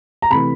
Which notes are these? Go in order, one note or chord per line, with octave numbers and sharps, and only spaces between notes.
A#5
C3 E3 A3 B5